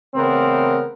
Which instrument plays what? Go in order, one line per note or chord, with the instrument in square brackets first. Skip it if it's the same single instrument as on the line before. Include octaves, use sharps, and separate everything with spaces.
[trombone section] A1 C#3 B3 C4 A#4